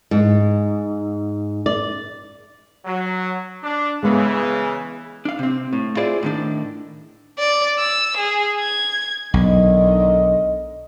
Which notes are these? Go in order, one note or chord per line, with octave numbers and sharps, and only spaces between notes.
G#2
D5
F#3
D4
C#3 E3 G#3 B3
D4 F5
C3 C4
A2
E4 F4 G#4 C5 D5
A2 D#3 D4
D5
E6
G#4
G#6
B1 D3 D#3 D#5